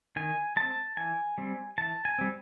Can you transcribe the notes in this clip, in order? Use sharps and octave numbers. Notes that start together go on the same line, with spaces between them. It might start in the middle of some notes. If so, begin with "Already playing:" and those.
D#3 G#5
G#3 C4 A5
E3 G#5
G3 C4
E3 A5
G#5
G3 C4